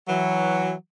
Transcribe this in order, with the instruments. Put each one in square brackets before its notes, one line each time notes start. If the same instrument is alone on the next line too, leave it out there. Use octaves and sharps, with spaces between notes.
[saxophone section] E3 F#3